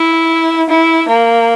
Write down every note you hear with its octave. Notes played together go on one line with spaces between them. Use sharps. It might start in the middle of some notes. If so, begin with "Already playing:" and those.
Already playing: E4
E4
A#3